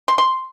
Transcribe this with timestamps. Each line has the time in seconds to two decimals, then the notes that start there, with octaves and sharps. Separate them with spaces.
0.08 C6
0.18 C6